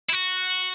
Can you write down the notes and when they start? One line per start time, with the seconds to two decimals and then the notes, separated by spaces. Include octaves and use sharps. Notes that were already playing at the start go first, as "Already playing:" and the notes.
0.10 E4
0.13 F#4